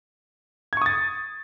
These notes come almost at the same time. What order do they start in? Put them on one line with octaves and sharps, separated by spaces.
G#6 C#6 D#6 A6